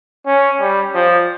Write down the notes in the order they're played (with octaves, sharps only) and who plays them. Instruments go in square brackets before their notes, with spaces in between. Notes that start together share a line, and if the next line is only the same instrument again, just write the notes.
[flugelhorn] C#4
G3
F3